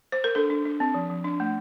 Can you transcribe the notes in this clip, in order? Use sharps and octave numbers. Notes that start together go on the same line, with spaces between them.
C5
A#4
D4 A4
D4
D4
C4
F3
F3
D4
A3